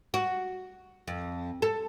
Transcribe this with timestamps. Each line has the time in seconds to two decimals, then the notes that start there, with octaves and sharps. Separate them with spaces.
0.14 F#4
1.08 F2
1.62 A4